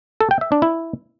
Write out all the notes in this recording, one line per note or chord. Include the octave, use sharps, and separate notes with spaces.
A4
G5
E5
D4
E4